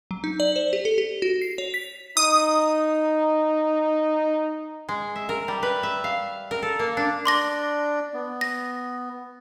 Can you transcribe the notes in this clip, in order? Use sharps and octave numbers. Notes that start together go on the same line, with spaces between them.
F#3
D#4
D5
C5
G4
A4
G4
F#4
C7
C#5
B6
D#4 D#6
G#3
E5
A#4
G3
B4
E5
F5
A#4
A4
A#3
D4
D4 D5 C6 D6 A#6
B3
A#6